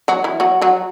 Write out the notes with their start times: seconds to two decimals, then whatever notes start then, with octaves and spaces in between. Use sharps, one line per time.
0.08 F#3 F#4
0.24 E3 E4
0.40 F#3 F#4
0.62 F#3 F#4